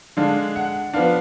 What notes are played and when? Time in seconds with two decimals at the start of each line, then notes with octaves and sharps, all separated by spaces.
0.17 D3 G#3 D4 F5
0.56 F#5
0.93 F3 B3 D4 F5